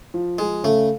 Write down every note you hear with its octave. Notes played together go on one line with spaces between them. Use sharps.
F3
F3 G#3
C#3 A3